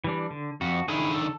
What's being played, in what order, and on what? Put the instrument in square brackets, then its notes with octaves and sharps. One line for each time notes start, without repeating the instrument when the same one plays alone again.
[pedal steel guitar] E3 G3 D4
D3
[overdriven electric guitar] F2 [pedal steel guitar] F#4
[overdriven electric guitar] D3 D#3 [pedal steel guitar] E4 G#4
[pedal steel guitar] A4